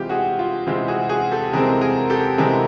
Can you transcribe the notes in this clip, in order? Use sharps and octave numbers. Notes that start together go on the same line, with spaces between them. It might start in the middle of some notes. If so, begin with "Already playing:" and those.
Already playing: C3 E3 G#3 C4 F4 G4
F#4 G#4
F4
C3 E3 G#3 C4 F4
F#4 G#4
F#4 G#4
G4 A4
C3 E3 G#3 C4 G#4 A#4
G#4 A#4
G4 A4
C3 E3 G#3 C4 G#4 A#4